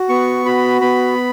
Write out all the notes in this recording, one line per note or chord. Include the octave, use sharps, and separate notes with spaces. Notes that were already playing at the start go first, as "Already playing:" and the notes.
Already playing: F#4
B3 C#6
F#4 B5
B3 B5